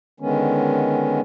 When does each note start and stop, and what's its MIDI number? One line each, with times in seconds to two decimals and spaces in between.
0.20 1.21 50
0.20 1.21 51
0.20 1.21 56
0.20 1.21 59
0.20 1.21 61